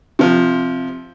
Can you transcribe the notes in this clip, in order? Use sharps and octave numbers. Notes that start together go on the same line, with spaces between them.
C3 F3